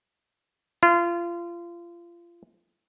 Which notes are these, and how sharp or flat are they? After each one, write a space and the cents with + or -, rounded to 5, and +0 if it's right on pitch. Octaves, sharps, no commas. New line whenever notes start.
F4 -25